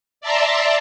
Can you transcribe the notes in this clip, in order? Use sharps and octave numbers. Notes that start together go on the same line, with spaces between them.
D5 E5 A5 A#5 C6